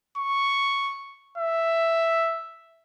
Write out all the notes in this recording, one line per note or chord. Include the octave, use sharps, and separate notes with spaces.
C#6
E5